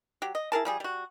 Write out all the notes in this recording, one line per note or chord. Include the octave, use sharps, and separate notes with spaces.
F#3 G4
D#5
E4 G#4 A#4 A5
F3 G3 G#4
G3 F#4